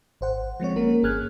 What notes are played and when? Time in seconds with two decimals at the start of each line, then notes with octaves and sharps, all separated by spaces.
0.21 G#1 C5 F#5
0.60 F3 G#3 C4 C#5
0.76 A#3 C#4 A#4
1.03 G1 G#4 F6 F#6 G#6